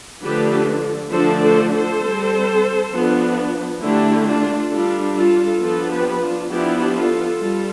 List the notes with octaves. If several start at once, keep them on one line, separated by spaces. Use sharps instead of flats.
D3 F3 A3 D4 G4 B4
D3 F3 A3 D4 A4 C5
A4 C5
A4 C5
G3 C4
F3 B3 D4
D3 A3 D4 E4 G4
D4 F4
G3 D4 F4 A4
F4 A4
F3 B3 D4 F4 A4
G4 B4
D4 F4
F3 B3 D4 E4 G4
F4 A4
G3 F4 A4